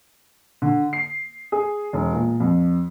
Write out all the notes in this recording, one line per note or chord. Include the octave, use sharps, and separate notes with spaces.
D3
C7
G#4
E1
A#2
F2